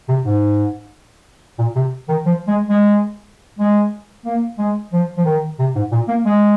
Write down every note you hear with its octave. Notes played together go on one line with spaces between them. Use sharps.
C3
G#2
A#2
C3
D#3
F3
G#3
G#3
G#3
A#3
G#3
F3
F3
D#3
C3
G#2
A#2
A#3
G#3